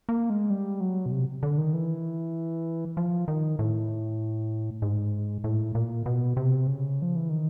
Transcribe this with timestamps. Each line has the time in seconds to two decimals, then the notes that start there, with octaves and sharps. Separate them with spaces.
0.09 A#3
0.30 G#3
0.50 G3
0.81 F#3
1.06 B2
1.12 C3
1.43 D3
1.58 D#3
1.74 E3
2.97 F3
3.28 D#3
3.59 A2
4.82 G#2
5.44 A2
5.75 A#2
6.06 B2
6.37 C3
6.67 C#3
7.02 F3
7.16 E3
7.29 D#3